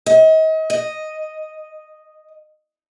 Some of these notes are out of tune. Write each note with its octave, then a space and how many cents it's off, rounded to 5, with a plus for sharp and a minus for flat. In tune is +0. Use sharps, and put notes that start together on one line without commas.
D#5 +35
D#5 +0